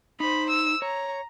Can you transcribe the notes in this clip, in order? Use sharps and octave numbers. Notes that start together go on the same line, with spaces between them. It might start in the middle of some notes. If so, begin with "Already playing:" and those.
D#4 C5 B5
E6
C#5 A#5